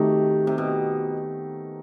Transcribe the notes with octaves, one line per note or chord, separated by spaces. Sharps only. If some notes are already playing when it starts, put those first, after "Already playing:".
Already playing: C3 D#3 A3 D#4 F#4
C3
B2